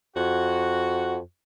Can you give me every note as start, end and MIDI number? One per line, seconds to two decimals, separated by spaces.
0.16 1.20 41
0.16 1.15 66